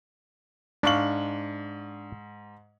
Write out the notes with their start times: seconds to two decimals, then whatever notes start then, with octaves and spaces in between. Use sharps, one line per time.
0.83 G#2 D4 F5 C#6 F#7